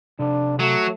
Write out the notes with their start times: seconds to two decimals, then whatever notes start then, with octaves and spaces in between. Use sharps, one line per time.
0.19 C3 D4 A4
0.59 F#3 A3